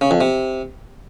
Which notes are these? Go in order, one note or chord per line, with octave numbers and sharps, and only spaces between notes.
C#3
F2
C3